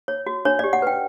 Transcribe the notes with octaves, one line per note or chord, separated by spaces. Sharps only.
C#5
F#4
D4 C#5
D5
G4
F#5
B4 G5